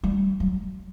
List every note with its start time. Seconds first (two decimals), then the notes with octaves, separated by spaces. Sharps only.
0.04 G3
0.40 F#3